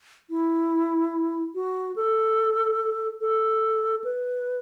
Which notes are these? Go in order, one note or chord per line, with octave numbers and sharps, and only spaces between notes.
E4
F#4
A4
A4
B4